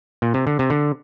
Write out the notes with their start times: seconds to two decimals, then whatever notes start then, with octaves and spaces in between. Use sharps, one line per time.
0.22 A#2
0.34 C3
0.47 D3
0.59 C3
0.70 D3